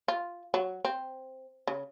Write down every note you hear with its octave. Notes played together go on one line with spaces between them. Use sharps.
F4
F#3
C4
C#3